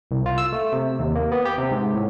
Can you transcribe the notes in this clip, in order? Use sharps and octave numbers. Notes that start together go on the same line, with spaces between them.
C2
F4
E6
A3
C3
D#2
A#3
B3
G4
C3
G#2
A2